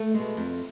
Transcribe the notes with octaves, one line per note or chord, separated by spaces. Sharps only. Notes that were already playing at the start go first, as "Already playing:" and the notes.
Already playing: A3
B2 G#3
F2